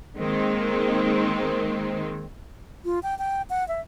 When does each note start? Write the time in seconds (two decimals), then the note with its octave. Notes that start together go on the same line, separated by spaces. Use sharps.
0.17 D#3 G#3 A#3 C4
2.85 F4
3.03 G5
3.19 G5
3.50 F#5
3.68 E5